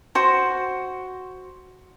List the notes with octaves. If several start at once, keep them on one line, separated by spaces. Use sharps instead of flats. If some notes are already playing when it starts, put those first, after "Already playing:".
F#4 C5